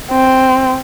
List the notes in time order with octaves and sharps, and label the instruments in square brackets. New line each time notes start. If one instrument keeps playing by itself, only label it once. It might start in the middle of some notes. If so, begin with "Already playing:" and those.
[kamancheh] C4